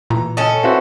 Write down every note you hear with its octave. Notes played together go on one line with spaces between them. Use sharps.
A#2 E3 A#5
C#4 A4 D#5 G#5
C4 E4 F#4 B4 E5 C6